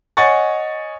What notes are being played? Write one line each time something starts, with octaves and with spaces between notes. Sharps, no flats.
C#5 D#5 F#5 G#5 C#6 A6